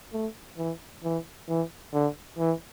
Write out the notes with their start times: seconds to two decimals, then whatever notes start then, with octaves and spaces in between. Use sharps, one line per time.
0.13 A3
0.57 E3
1.04 E3
1.48 E3
1.93 D3
2.38 E3